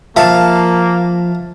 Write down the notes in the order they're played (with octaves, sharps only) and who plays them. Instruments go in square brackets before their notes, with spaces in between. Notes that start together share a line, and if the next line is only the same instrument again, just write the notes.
[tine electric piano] F3 [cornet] A#3 [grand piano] E5 [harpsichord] F5 A5